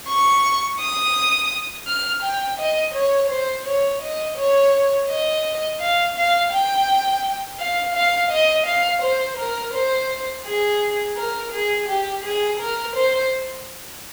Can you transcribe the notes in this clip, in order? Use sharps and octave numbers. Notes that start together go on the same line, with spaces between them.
C#6
D#6
F6
G5
D#5
C#5
C5
C#5
D#5
C#5
D#5
F5
F5
G5
F5
F5
D#5
F5
C5
A#4
C5
G#4
A#4
G#4
G4
G#4
A#4
C5